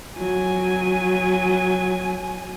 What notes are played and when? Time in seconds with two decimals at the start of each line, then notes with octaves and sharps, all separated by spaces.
0.18 F#3 G#5